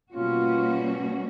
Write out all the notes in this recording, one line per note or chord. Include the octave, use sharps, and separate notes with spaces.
B2 G3 A#3 C#4 F4 F#4